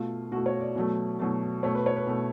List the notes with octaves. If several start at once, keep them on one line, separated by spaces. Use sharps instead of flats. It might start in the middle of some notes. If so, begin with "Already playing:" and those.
Already playing: B2 A3 F4
B2 A3 F#4
C#5
D5
B2 F#3 A3
B2 F#3 A3
B2 A3 C#5
B4
C#5
B4
B2 A3